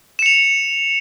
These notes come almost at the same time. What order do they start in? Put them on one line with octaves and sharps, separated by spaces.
E7 C#7 F7